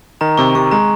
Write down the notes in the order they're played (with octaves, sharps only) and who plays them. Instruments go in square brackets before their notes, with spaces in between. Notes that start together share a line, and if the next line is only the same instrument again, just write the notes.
[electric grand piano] D#3 [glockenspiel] A#5
[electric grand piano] C3 [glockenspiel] C#6
[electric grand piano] C3 [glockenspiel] C#6
[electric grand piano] G#3 [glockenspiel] A#5